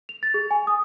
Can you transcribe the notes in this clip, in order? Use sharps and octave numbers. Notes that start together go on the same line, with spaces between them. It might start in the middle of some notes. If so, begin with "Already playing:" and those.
F7
A6
G#4
G#5
D#6